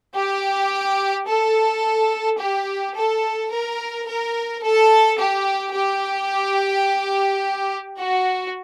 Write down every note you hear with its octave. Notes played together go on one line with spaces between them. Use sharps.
G4
A4
G4
A4
A#4
A#4
A4
G4
G4
F#4